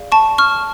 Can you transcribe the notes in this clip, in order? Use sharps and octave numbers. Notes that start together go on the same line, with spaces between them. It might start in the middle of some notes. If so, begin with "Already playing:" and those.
Already playing: G#4 D5 F5
A5 C#6
C#6 F6